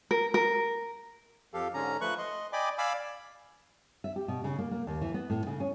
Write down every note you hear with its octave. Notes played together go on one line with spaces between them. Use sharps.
A#4
A#4
F2 F3 G4 A4 F5
G#2 D3 C#4 A#5
F3 A3 B4 C#6 F#6
D#5 C6
D5 D#5 G5 G#5 B5 D6
D5 F5 G#5 B5 D6 E6
E5
G4
B2
C#3
A#3
A#3
D#2
E3
B3
A2
C#3
C#4